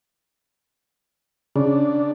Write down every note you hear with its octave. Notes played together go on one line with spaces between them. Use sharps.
C#3 D4